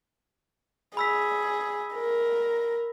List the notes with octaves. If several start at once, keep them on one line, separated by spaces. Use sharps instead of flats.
G#4 B5 E6 B6
A#4